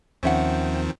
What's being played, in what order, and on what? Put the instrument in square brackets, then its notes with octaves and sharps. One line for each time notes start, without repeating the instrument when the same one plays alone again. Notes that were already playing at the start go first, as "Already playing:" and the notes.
[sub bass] D#2 [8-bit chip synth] D#3 F3 C4 [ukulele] C#4 E5 F#5